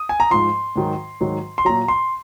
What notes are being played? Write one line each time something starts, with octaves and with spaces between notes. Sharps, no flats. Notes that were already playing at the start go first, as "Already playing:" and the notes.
Already playing: D#6
G#5
A#5
G#2 F3 C6
G#2 D#3 F#3
G#2 D#3 F#3
C6
A#2 F#3 A#5
C6